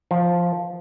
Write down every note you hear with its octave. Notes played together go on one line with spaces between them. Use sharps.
F3